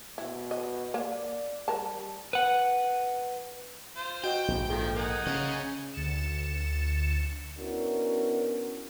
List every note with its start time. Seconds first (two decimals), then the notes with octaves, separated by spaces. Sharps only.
0.18 B2 E4
0.51 D#5
0.94 A#3 D5
1.68 G3 A#4 A5
2.33 B4 F#5
3.96 F4 C5
4.24 F#4 D#5 G5
4.48 A#1 G#2
4.69 D#3 F3 F4 G#4 A4
4.96 D#4 A#4 F#5 G#5
5.26 C#3 C#4 G#4
5.93 D2 A6 C#7 E7
7.58 B3 C#4 D4 E4 F#4 A#4